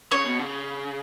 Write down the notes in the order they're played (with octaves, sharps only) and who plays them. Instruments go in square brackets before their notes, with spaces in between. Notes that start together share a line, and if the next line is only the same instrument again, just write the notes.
[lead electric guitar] C#3 [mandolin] C#5
[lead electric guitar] B2
C#3